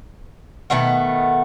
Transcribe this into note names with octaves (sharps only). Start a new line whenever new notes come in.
B2 D#3 A3 B3